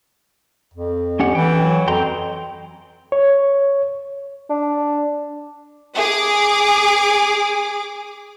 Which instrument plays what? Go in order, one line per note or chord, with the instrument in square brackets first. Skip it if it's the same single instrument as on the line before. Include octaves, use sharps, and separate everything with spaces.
[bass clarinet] F2
[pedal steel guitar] C#4 G4 F#5
[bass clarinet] E3 [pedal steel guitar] G5
[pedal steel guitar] F#3
[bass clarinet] F2 [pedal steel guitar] G5 A#5 C6
[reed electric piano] C#5
[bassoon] D4
[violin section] G#4 D6